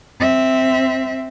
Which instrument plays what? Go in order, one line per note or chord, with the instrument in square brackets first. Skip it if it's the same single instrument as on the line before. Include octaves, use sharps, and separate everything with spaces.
[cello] C4 E5